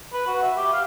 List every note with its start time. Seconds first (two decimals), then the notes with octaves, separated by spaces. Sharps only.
0.13 B4
0.27 F#4
0.42 E5
0.56 G4
0.73 F5